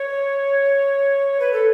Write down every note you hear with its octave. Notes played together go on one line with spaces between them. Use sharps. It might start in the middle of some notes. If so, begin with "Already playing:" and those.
Already playing: C#5
B4
A4